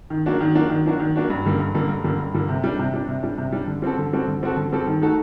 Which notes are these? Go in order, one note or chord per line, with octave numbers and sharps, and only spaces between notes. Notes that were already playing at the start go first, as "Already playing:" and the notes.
D#3
F#3 A#3 D4 F#4
D#3
F#3 A#3 D4 F#4
D#3
F#3 A#3 D4 F#4
D#3
F#3 A#3 D4 F#4
G2
D3 G3 A#3
G2
D3 G3 A#3
G2
D3 G3 A#3
G2
D3 G3 A#3
C3
G3 D4
C3
G3 D4
C3
G3 D4
C3
G3 D4
D3
G3 C4 F#4 A4
D3
G3 C4 F#4 A4
D3
G3 C4 F#4 A4
D3
G3 C4 F#4 A4
D#3
A3 D#4 F#4 A4